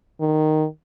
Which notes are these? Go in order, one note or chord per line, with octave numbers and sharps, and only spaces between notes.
D#3